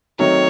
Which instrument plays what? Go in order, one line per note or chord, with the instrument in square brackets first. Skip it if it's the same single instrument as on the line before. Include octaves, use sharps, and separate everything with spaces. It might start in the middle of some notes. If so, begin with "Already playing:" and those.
[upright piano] D#3 F#3 A3 C4 [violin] C#5